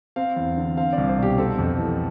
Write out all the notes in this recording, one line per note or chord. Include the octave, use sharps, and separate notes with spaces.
C4 F5
E2
D3
C4 F5
C2 D5
C5
B2 G4
G4
C4 A4
F2
E3